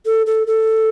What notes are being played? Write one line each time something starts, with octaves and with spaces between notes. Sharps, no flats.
A4
A4
A4